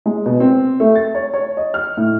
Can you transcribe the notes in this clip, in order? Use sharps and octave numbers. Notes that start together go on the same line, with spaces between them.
G#3
B2
C4
A3
A6
C#5
C#5
D#5
F6
A2